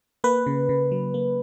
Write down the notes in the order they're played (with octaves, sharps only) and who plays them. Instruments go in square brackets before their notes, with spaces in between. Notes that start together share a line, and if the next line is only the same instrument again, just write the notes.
[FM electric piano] A#3 B4
C#3
C#3
F#3
A#3